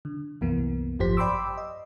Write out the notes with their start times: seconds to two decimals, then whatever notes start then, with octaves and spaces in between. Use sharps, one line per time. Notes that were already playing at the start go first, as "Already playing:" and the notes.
0.05 D3
0.41 C2 F#2 E3 A#3 B3
0.99 G#1 F#2 F3 G4 C5 B6
1.17 D5 G5 B5 C6 D6 E6
1.58 D#5